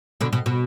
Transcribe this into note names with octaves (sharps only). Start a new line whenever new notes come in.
B2 D3
B2
B2